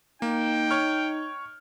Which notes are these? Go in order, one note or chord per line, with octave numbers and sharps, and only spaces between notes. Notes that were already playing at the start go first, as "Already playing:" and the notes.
A#3 D#4 G5
C#5 C#6 F6